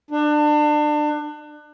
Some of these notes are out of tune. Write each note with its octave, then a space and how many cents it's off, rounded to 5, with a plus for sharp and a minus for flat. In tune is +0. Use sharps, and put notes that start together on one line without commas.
D4 +30